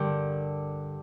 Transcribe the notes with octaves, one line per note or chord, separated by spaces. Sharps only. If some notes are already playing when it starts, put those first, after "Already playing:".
Already playing: G2 D3 G4 A#4